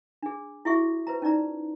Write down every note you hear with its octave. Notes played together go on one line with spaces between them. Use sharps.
D4 G#4
E4 F#4 G#4 E5 C#6
B4 C5 A#5
C#4 D#4 D5 A#5